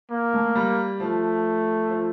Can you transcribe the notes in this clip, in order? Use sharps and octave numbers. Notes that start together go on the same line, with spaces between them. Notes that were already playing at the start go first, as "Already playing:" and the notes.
A#3
A3
G3
F3 A3
F3